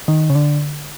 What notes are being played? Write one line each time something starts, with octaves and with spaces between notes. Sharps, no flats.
D#3
C#3
D3